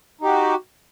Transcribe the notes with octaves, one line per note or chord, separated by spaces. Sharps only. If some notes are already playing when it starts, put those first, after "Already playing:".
D#4 F#4 G4